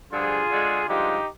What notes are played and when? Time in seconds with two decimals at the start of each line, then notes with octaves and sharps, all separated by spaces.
0.12 G2 D3 F3 F4 G#4
0.50 D3 G#3
0.88 G2 D3 F3 G#3 D#4 G4